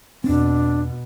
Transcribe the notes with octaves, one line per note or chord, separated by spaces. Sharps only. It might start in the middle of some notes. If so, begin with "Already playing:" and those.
E2 B2 C4 D4